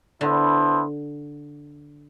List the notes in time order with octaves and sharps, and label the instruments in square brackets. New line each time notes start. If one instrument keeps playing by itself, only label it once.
[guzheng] D3 [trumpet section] B3 E4 A4 C5